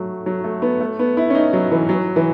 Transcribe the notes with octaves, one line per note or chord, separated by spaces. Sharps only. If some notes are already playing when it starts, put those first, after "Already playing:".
Already playing: F#3 A3
F#3
A3
B3
A3
B3
E4
C#4
D#4
F#3
E3
F#3
E3